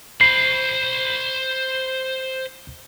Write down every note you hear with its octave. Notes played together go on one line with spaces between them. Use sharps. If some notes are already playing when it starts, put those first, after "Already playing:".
C5 B5 C7